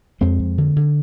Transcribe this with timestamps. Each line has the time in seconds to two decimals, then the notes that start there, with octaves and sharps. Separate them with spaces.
0.21 F2 G#3 C4
0.40 F2
0.58 D3
0.76 D3